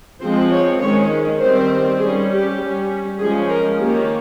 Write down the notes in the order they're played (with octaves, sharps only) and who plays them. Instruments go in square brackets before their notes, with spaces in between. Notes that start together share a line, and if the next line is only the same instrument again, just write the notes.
[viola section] F3 G#3 C4 C5
C#5
D#3 G#3 C#4 C#5
D#3 G3 C4 C5
G3 C#4 G#4
G4
G3 C#4
F3 G#3 C#4 G#4
A#4
D#3 A#3 C#4 G4